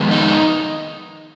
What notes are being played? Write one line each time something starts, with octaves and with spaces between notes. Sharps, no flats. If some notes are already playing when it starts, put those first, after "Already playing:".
Already playing: F2 D#3 G#3 B3
D#4